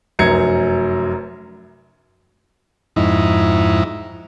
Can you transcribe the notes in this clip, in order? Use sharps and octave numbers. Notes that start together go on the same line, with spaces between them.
F1 F#2 F#3 A#5 G#6 C#7
F2 G#2 D#4 E4